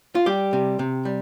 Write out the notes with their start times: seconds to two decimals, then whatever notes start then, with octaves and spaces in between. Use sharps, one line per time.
0.15 F4
0.26 G3 G4
0.53 C3
0.79 C3
1.05 G3